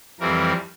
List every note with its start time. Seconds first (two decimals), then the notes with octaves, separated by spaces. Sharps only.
0.20 F2 E3 G3 C4 A#4